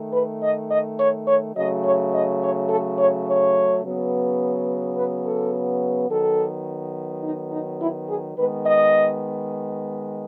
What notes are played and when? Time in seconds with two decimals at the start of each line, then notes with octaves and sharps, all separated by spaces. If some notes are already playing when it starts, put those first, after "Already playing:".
Already playing: D#3 A3
0.13 B4
0.42 D#5
0.70 D#5
0.98 C#5
1.26 C#5
1.55 C#3 F#3 A3 D#5
1.84 C#5
2.13 D#5
2.40 C#5
2.69 A4
2.97 C#5
3.25 C#5
3.83 C#3 F#3 B3
4.96 B4
5.24 A4
6.09 D#3 F#3 B3 A4
7.23 D#4
7.51 D#4
7.79 E4
8.08 G#4
8.36 D#3 G#3 B3 B4
8.65 D#5